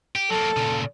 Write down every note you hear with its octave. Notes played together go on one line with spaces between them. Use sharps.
G4
F#3 A#3 A4
A#2 C#3